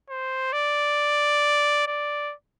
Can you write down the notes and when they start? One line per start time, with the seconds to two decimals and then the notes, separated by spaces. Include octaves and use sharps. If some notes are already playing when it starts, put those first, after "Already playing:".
0.09 C5
0.53 D5
1.87 D5